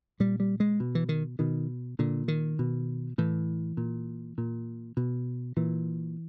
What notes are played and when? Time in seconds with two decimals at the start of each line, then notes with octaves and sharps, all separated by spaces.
0.20 A#2 G3
0.40 G3
0.60 G#3
0.80 B2
0.95 E3
1.09 D#3
1.39 B2 D#3
1.99 A#2 D3
2.28 D#3
2.59 B2
3.18 A2 E3
3.77 A#2
4.38 A#2
4.97 B2
5.57 A#2 E3